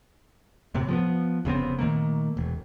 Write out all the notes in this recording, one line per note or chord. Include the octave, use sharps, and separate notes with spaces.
F#2 A2 C3
F3 G#3 B3
F1 C#3 B3 C4
A#2 D#3 A3 A#3
E1